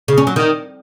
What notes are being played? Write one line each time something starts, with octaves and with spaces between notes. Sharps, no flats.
C#3
C#4
F#3
D#3